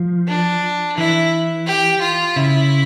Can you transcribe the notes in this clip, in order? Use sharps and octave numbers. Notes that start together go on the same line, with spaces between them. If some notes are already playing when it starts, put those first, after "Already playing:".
Already playing: F3
D4
E3 E4
G4
F4
C#3 E4